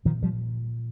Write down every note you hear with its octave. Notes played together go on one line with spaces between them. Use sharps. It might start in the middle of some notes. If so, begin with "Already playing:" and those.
A#2 D#3 F3
F3 G3